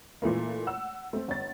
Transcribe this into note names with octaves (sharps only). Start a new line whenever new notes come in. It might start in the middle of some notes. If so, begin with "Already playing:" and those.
A#2 E3 A3 A#3
F#5 E6
A3 C4
G1 A6